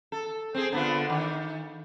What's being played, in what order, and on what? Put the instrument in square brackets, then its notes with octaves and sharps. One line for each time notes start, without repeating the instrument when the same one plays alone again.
[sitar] A4
C4 G#4
D3 B3 F4
D#3